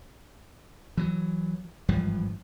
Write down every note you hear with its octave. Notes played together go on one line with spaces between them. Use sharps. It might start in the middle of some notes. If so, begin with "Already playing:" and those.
E3 F#3
G#1 G2 E3 F3